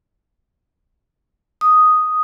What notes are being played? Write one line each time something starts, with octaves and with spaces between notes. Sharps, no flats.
D#6